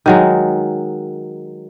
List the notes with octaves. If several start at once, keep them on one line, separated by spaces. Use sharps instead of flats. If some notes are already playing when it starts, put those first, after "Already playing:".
D#3 F#3 G#3